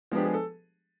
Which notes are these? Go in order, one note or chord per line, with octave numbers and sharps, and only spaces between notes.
F3 G#3 B3 D4 G4
G#4
A4